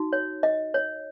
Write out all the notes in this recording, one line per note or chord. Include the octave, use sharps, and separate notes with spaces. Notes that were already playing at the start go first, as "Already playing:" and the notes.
Already playing: D#4 F#4
C#5
D#5
C#5